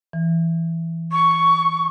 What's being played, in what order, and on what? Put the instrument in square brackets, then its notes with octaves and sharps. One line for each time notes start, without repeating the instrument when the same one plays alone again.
[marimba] E3
[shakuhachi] C#6